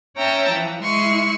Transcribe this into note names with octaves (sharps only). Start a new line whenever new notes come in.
C#4 C#5 E5 G5 A5 A#5
E3 F3
G#3 E4 C6 C#6